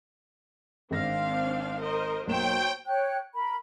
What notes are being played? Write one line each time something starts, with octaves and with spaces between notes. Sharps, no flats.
G#1 C4 D4 F5 A#6
A#4 C5 D#5
B1 F#3 A#3 C5 C#5 G5 E7
C#5 G5 F#6
A#4 B5